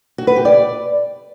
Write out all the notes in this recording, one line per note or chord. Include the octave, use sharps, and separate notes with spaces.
F#4
B4
G4
D5